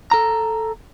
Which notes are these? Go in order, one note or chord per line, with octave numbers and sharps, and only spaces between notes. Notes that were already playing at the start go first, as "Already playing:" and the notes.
A4 A#5